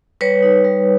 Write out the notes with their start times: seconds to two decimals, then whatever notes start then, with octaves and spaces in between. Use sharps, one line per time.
0.21 G3 B4 C#5
0.42 D#4
0.64 G3